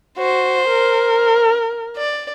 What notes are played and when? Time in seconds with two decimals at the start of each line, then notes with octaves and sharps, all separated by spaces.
0.18 F#4 C5
0.68 A#4
1.97 D5